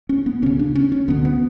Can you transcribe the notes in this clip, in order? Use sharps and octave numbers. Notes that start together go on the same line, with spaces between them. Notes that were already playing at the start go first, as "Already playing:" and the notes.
C#4
B3
D2 C#3 C#4
D4
C#4
C#4
D2 D3 B3
B3